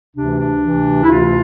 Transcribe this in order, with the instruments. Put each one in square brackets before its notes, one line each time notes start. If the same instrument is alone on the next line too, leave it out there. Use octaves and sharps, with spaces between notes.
[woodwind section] D2 C3 E3 D4
D4
D2 C3 E3
E4
D2 C3 E3 F4